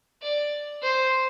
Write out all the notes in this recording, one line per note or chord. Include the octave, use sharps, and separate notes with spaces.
D5
C5